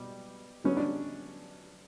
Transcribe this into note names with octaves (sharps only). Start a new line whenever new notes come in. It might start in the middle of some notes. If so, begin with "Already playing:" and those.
Already playing: B2 G3 B3
D3 F#3 B3 C#4
D4